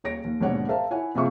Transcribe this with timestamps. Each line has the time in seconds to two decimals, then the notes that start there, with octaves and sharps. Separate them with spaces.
0.04 D#1 C#5 A#6 D7
0.24 D#2
0.41 G#1 D#2 B2 D3 C#5 F#5
0.69 A#4 C5 E5 F5 A5
0.91 E4 C#5 F#5 G#5
1.15 F#1 C3 F4 G#4 E5 C#6